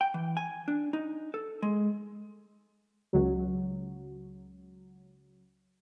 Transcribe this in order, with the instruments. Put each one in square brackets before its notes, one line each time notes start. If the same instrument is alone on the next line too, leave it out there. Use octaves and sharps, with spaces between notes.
[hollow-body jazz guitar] G5
E3
G#5
D4
D#4
A4
G#3
[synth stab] C#2 F#3